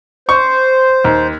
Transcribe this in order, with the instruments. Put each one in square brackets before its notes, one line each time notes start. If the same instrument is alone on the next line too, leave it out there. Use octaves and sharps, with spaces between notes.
[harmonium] C5 [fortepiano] C#6
[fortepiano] D#2